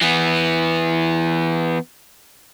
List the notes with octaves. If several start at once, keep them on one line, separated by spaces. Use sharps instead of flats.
E3 B3